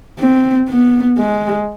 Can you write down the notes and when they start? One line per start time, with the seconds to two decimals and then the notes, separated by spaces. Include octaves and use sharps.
0.19 C4
0.69 B3
1.18 G#3